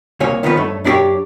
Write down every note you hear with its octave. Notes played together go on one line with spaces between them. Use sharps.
C2 A#3 C#5 G#5
D#3 F3 B3 C#4 F#4 B4
G2 A3 C#5
F#2 D4 E4 F4 G4 C#5